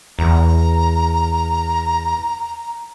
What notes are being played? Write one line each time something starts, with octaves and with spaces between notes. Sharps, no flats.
E2 A#5